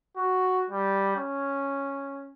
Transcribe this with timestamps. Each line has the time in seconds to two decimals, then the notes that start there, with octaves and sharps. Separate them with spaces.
0.17 F#4
0.70 G3
1.17 C#4